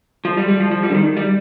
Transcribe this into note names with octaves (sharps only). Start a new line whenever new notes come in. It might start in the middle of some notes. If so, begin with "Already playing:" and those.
F3
G3
G3
F3
F3
G3
D3
D#3
G3